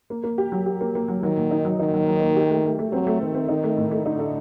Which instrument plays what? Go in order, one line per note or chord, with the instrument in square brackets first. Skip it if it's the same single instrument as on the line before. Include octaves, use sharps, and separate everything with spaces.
[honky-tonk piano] A#3
A#3
G4
F#3
G4
A#3
A#3
F#3
[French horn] D#3 [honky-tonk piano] F#3
[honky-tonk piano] A#2
D#4
F#3
[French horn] D#3 [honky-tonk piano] D#4
[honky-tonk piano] F#3
F#3
A#3
G4
A3
A3
A3
[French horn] F#3 [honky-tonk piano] C4
[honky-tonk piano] A3
[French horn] D#3 [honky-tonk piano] C4
[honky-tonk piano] C4
[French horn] D#3 [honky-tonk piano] D#4
[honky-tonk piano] A3
A2
A3
[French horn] D3 [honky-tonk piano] D#4
[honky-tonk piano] A4